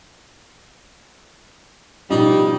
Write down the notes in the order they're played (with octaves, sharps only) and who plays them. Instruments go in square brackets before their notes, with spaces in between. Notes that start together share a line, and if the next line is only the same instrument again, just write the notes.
[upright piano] B2 F3 D#4 [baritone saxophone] G3